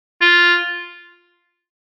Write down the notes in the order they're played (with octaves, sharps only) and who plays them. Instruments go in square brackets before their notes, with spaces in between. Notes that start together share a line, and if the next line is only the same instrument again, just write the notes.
[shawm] F4